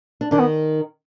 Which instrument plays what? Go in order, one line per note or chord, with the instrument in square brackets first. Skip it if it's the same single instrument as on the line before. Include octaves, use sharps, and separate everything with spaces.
[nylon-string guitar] D4
[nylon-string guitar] D#3 D#4 [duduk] D4
[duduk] B3